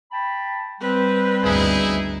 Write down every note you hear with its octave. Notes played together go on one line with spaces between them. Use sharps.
G5 A5 B5
G3 C4 B4
G1 D2 D#4 E4 G#4